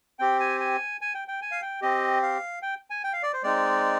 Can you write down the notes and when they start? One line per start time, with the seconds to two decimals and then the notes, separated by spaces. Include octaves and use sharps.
0.19 C4 G4 G5
0.40 G#5
0.60 G#5
1.01 G#5
1.14 G5
1.28 G5
1.42 G#5
1.51 F5
1.62 G5
1.81 C4 G4 D#5
2.22 F5
2.62 G5
2.90 G#5
3.04 G5
3.13 F5
3.23 D5
3.33 C5
3.43 G#3 C4 D#4 D5